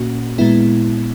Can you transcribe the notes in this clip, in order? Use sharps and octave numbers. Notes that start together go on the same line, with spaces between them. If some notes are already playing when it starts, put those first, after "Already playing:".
Already playing: A#2 A#3 C#4 F#4
A#2 G#3 B3 E4